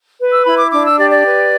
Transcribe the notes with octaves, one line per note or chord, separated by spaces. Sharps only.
B4
E6
E4 B5
D6
D4 D6
E6
G4 D5
D5
B4